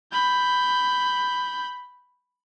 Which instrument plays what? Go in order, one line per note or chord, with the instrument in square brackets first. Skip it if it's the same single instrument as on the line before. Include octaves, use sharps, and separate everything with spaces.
[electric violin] B5 G6